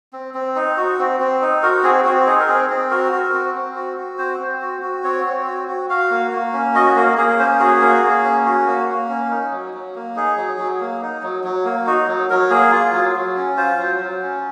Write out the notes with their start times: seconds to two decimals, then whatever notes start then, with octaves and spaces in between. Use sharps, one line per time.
0.13 C4
0.34 C4
0.56 D#4
0.77 F#4
0.99 C4
1.20 C4
1.42 D#4
1.63 F#4 A#4
1.83 C4 G#4
2.05 C4 F#4
2.26 D#4 G#4
2.40 A#4
2.48 C4 G#4
2.70 C4
2.91 F#4 A#4
3.12 F#4
3.33 C4
3.55 C4
3.76 F#4
3.98 F#4
4.18 C4 C5
4.40 C4
4.61 F#4
4.82 F#4
5.04 C4 C#5
5.26 C4
5.47 F#4
5.68 F#4
5.90 F#4 F5
6.11 A#3
6.32 A#3
6.53 C#4
6.75 F#4 D#5
6.96 A#3 F#4
7.17 A#3 G#4
7.39 C#4 C5
7.60 F#4 G#4
7.81 A#3
8.02 A#3
8.24 C#4
8.46 F#4
8.66 A#3
8.88 A#3
9.09 C#4
9.30 D#4
9.52 F#3
9.74 F#3
9.95 A#3
10.16 D#4 G#4
10.37 F#3
10.58 F#3
10.80 A#3
11.02 D#4
11.23 F#3
11.44 F#3
11.65 A#3
11.87 D#4 F#4
12.08 F#3
12.30 F#3 A#4
12.50 A#3 G#4
12.72 F4
12.93 F#3
13.16 F#3
13.36 C#4
13.57 F4 C5
13.79 F#3
14.00 F#3
14.22 C#4